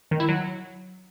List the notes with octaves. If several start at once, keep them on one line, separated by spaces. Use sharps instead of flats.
D#3
E4
F#3